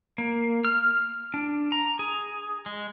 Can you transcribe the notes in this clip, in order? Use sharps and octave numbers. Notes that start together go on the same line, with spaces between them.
A#3
F6
D4
A#5
G#4
G#3